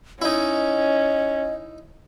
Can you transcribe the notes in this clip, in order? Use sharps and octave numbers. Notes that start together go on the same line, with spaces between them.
C#4 D#4 E4 D#5